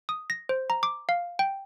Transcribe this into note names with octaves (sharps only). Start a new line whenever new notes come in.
D#6
A#6
C5
A#5
D6
F5
G5